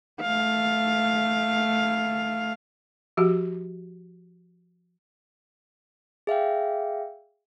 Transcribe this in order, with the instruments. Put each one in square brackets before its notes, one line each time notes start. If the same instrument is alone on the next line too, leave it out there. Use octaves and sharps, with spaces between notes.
[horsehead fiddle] A3 F5
[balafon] F3 F#4 G4
[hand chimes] G#4 E5 F5 G5